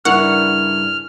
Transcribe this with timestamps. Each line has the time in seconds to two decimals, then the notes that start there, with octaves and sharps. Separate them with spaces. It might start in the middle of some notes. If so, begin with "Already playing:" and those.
0.05 G2 C#3 E4 A#4 F#5 C#6 F6